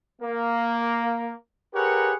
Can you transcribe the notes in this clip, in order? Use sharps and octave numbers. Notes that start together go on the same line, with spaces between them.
A#3
G4 G#4 A#4 B4 C#5 F#5